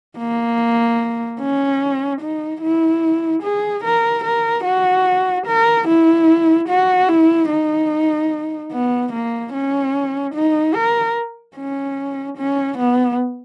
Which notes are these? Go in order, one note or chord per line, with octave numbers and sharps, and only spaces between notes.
A#3
C#4
D#4
E4
G#4
A#4
A#4
F#4
A#4
E4
F#4
E4
D#4
B3
A#3
C#4
D#4
A#4
C#4
C#4
B3